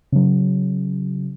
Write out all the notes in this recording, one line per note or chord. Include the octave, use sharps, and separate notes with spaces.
C#3 F#3